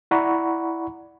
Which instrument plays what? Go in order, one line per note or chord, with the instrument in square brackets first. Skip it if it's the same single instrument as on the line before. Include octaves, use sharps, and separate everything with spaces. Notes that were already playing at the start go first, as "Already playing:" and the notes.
[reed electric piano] E4 D5 F#5 A#5 B5 C#6